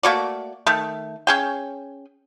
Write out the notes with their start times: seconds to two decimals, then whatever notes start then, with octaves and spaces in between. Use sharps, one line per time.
0.03 A3 A#3 F#4 D5
0.67 D#3 A3
1.27 C#4 G#4 G5